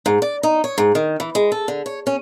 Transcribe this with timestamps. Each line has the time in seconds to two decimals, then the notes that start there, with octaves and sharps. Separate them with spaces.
0.06 G#2
0.22 D5
0.43 D#4
0.64 C#5
0.78 G#2
0.95 D#3
1.20 E3
1.35 G#3
1.52 A4
1.68 D3
1.86 C#5
2.07 C#4